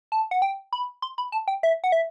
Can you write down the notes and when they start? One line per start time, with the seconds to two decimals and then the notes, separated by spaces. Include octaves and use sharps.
0.12 A5
0.31 F#5
0.42 G5
0.73 B5
1.02 C6
1.18 B5
1.32 A5
1.48 G5
1.63 E5
1.84 F#5
1.92 E5